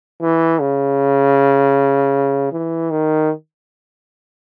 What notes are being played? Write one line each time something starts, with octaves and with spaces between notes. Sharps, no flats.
E3
C#3
E3
D#3